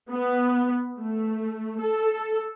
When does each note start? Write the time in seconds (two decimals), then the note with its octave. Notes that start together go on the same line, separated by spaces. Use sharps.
0.11 B3
0.99 A3
1.80 A4